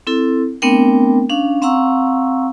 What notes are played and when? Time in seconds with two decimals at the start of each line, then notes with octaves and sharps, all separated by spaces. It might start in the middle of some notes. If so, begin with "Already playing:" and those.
0.07 C4 E4 A4
0.62 A3 B3 C4 D4 A#4 G5
1.30 C#4 D4 F5
1.62 C4 F5 F#5 A#5 C#6 E6